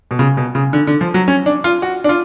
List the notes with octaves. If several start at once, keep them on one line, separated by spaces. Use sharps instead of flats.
B2
C#3
B2
C#3
D3
D3
F3
F#3
C#4
D4
F4
F#4
D4
F4